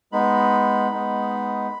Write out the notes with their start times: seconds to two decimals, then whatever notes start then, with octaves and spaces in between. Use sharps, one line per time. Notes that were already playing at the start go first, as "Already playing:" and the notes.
0.12 G#3 B3 D#4 B5
0.91 G#3 B3 D#4